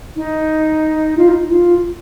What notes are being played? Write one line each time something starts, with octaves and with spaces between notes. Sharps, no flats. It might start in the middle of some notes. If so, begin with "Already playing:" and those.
D#4
F4
D#4
F4